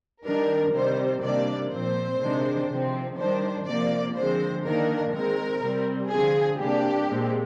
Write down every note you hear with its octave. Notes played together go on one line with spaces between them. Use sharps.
D#3 G3 D4 A#4
C3 D#3 G3 C5
C3 D#3 G3 A#3 D4 D5
A#2 F3 C4 C5
C3 D#3 G#3 D4
C3 F3 C4
D#3 G3 D4 C5
C3 F3 A#3 D5
D3 F3 G#3 C4 C5
D#3 A#3 D4 A#4
D#3 G#3 C4 A#4
C3 G3 C4
D3 F3 C4 G#4
C3 G3 A#3 D4 G4
A#2 G#3 C4